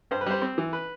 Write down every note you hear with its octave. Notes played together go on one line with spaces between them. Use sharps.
G2 C5
B4
G3 C5
C4
E3
B4